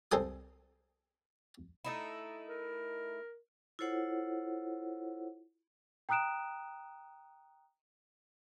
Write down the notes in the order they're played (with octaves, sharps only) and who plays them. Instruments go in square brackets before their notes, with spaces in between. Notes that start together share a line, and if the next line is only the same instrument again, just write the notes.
[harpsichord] C2 C4 A4 G#5 D#6
[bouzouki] A3 D#4 E4
[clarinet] A#4
[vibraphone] E4 F4 A4 C5 C#5 F#5
[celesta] G5 A#5 D#6 F#6 D7 E7